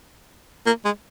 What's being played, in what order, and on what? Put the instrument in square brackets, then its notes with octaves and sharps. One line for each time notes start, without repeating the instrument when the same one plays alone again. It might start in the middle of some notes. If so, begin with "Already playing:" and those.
[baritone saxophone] A#3
G#3